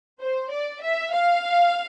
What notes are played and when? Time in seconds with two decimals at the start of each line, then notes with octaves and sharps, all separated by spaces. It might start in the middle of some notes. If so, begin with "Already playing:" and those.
0.21 C5
0.52 D5
0.83 E5
1.14 F5